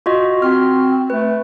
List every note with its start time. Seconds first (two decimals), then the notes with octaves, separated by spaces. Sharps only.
0.06 F4 F#4 D#5
0.42 C4 F#4 C6 F6
1.10 A3 B4